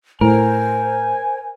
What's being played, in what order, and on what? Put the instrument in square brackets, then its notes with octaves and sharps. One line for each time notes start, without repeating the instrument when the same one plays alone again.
[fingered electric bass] A2 [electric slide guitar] A#4 [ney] C5 [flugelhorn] G#5